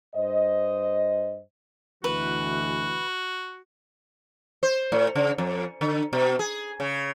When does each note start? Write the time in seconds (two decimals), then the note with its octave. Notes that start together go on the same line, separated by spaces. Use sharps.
0.15 G2 C5 D#5
2.04 D2 B2 E3 F#4 B4
4.63 C5
4.92 A2
5.15 C#3
5.38 F2
5.81 D3
6.13 B2
6.39 G#4
6.80 C#3